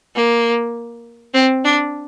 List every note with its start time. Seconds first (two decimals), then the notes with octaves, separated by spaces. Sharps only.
0.15 A#3
1.34 C4
1.65 D4